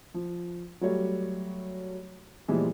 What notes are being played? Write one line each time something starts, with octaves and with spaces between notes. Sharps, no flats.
F3
F#3 G3 A3 C#5
A#2 E3 F3 G3 G#3 B3